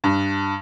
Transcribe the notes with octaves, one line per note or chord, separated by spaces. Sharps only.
G2